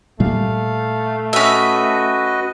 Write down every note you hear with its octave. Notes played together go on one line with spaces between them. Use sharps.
A#2 G3 A3 F5
C#4 F#4 B4 D#5 E5